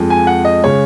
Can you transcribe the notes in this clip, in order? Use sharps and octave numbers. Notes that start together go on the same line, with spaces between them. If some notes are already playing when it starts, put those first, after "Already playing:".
Already playing: F2 F3 G#3
G#5
F#5
D#5
C#3 G#3 C#5